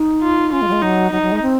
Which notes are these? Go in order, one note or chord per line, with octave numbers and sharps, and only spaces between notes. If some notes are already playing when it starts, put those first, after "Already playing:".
Already playing: D#4
F4
C#4 F4
G#3
F#3
G#3
F#3 D#4
F#3 D#4
F#3
G#3
C4